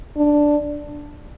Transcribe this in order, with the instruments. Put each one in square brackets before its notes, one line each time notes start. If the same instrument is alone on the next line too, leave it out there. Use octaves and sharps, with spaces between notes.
[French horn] D4